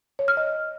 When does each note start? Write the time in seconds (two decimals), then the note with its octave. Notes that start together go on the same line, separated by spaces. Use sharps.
0.19 C#5
0.28 F6
0.37 D#5